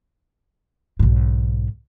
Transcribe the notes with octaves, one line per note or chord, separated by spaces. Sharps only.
B1 G#2